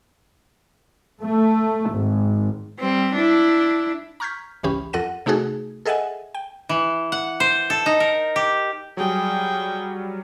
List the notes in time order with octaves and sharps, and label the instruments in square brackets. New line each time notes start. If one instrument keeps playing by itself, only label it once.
[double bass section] A3
G#1
[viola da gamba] G3 C4
D4 E4
[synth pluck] A#5 C#6 F6 G6 G#6 B6
G#1 C#2 E3 C#4 G4 B5
F2 A4 F#5 A#6 D#7
C3 A3 D#4 F#4 G#4 A4
G#4 A4 D#5 E5 F#5 G#5
G5
[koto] E3
F#5
C5
A4
D#4
A#4
G4
[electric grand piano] F#3 G3 [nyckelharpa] G#4 G5